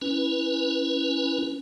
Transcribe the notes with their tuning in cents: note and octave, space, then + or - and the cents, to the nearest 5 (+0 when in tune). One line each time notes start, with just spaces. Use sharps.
C#4 +0 E4 +0 B4 -5